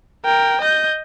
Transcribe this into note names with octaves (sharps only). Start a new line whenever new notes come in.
A#4 G5
D#5 G6